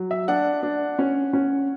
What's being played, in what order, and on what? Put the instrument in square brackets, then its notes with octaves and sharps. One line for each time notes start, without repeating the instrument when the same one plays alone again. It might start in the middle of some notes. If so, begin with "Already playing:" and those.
Already playing: [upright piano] F#3
E5
D4 F#5
D4
C#4
C#4